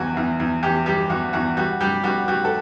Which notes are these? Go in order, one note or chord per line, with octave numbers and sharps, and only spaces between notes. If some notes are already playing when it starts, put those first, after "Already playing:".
Already playing: E2 G3 F#4
E2
E2
E2 G4
G3 G4
E2 F#4
E2 F#4
G3 F#4
G3 G4
G3 F#4
G3 F#4
A4